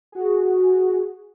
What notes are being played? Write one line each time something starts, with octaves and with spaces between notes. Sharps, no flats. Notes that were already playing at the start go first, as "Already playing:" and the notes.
F#4 G#4